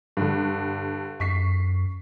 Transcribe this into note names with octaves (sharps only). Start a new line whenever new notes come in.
G2 D3
F#2 C#6 B6 C7